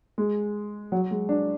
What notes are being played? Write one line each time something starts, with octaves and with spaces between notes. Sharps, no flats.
G#3
F#3
G#3
D4